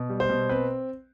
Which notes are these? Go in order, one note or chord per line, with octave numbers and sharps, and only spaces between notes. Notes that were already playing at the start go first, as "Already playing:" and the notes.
Already playing: B2
G3
C5
B2
C4 B4